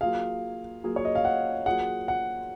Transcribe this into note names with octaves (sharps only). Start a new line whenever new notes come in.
F#3 A#3 F4 G#4 F5
F#3 A#3 F4 G#4
C#5
D#5
F5
F#5
F#3 A#3 F4 G#4 F#5
F#5